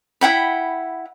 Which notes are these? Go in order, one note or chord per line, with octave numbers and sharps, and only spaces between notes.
E4 F#5 G5 B5